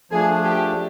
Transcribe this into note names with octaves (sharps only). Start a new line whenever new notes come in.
F3 A3 D4 G#4
G4